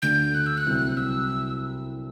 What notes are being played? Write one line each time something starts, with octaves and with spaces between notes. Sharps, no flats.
D2 D3 A3 G6
F#6
E6
F#6
C2 C3 F#3 C4 E4
E6